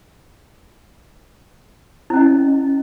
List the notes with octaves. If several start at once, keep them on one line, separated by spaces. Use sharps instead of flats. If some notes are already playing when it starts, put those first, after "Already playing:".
C#4 E4 D#5